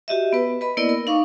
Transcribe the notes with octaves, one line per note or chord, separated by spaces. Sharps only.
F#4 G4 D#5 E5
B3 B4
B4 D#5 B5
A#3 B3 E4 A#4 D5 D#5
A#4
D#4 F5 C#6 D6